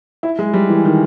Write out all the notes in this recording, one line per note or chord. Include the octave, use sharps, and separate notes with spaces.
E4
G#3
G3
E3
D#3